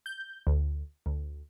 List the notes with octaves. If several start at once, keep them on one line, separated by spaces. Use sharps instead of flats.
G6
D2
D2